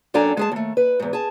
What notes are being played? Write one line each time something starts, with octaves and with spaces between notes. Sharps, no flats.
F#2 D4 A4 G5 G#5 A#5
G#3 G#4 A5
D#2 A3
B4
E2 G#2
G#4 A5